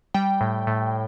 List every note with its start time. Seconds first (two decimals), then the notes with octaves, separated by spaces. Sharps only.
0.14 G3 G5
0.41 A2
0.67 A2